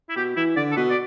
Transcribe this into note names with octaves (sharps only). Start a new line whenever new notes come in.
E4
B2 G4
E3 E4
D3 D5
A4
B2 B4
D5